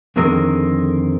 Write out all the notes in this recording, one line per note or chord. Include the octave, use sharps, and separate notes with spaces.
F2 D3 D#3 C4 G#4 A#4